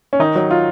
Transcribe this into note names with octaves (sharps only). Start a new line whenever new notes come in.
C#4
D#3 D#4
F#3
F4